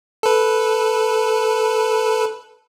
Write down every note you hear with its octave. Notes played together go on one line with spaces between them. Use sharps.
A4 B4